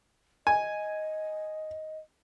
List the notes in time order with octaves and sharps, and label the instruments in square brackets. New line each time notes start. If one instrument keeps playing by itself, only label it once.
[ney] D#5 [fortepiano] G#5